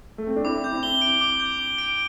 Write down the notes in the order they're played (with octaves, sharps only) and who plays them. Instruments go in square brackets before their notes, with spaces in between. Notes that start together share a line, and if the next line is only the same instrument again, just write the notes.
[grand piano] A3
C4
D4
[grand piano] C4 E4 [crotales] D6
[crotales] G6
[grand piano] C4 E4
[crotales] G7
D7
D6
G6
G7
D7